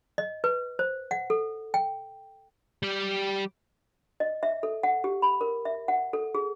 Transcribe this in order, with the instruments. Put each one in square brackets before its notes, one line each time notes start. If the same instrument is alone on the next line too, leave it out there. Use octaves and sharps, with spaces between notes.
[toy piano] D#5
B4
C5
F#5
A4
G5
[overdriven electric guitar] G3 G4
[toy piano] D#5
E5
A4
F#5
G4
B5
A#4
E5
F#5
A4
G#4